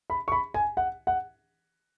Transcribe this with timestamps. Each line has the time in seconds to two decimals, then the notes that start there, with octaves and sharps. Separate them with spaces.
0.10 B5
0.28 C#6
0.32 B5
0.54 G#5
0.77 F#5
1.07 F#5